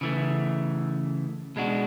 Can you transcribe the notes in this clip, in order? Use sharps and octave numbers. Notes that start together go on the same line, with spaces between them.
C#3 E3 A3
B2 G#3 D4 F#4